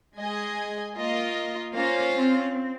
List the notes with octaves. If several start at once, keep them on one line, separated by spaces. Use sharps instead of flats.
G#3 G#4 D#5 G#5
A#3 F4 A#4 D#5
A#3 C#4 F4 C5 F5
C4